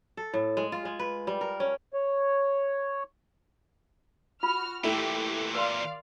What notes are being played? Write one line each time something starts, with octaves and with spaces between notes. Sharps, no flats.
A4
A2
G#3
F4
G#3
B4
G3
A#4
C#4
C#5
F4 F#4 B5 F6
A#2 E3 A3 E4 G4
A#4 D5 F5 C6